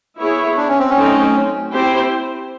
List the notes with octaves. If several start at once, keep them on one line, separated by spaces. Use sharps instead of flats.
B3 E4 G#4 C#5
D4
C#4
C4
C#4
F#3 A3 C4 D#4
C4 E4 G4 C5